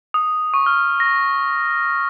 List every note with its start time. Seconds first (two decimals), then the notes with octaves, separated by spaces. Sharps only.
0.14 D#6
0.54 C#6
0.66 F6
1.00 A#6